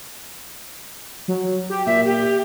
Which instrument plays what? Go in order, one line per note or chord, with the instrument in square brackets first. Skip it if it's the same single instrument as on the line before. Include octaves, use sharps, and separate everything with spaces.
[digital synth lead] F#3
G4
[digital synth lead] A#2 [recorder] E5
[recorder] G4